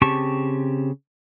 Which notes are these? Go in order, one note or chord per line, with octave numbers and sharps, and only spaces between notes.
C#3 C4 G4 A5 C#6